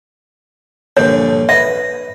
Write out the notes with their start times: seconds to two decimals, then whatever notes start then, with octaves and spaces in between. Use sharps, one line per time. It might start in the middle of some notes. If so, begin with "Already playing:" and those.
0.97 A#1 G2 D3 C#5
1.49 B4 E5 D#6